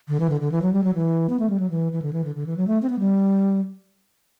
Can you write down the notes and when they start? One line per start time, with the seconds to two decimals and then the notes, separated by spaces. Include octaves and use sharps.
0.08 D3
0.20 E3
0.30 D3
0.41 D3
0.52 E3
0.62 F#3
0.73 G3
0.84 F#3
0.94 E3
1.29 B3
1.40 A3
1.50 G3
1.60 F#3
1.70 E3
1.93 E3
2.02 D3
2.13 E3
2.24 D3
2.35 D3
2.46 E3
2.57 F#3
2.67 A3
2.82 C4
2.90 B3
2.99 G3